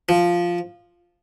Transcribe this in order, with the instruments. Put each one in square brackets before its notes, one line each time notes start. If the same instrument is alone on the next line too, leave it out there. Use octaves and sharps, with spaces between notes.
[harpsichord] F3